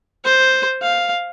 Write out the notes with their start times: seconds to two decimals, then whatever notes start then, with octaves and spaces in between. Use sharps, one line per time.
0.24 C5
0.82 F5